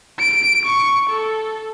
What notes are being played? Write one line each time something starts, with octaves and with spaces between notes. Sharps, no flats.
D7
C#6
A4